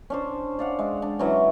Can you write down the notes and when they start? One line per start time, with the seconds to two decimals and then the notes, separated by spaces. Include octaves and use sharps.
0.10 C#4 D4 C5
0.59 D5 F5 F#5
0.79 G#3
1.02 D4
1.19 E3 F#3 C#4